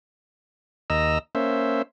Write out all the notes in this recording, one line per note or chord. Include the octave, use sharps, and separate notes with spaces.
D#2 D#5 A#5 E6
A#3 C#4 C5 E5